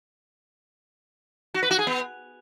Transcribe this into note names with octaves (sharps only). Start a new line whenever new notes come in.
F#4
B4
F#4
G#4
B3